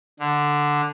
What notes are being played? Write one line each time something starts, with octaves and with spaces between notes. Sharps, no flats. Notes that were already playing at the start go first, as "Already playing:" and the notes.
D3